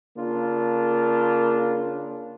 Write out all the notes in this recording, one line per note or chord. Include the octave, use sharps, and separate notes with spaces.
C#3 A#3 D4 F4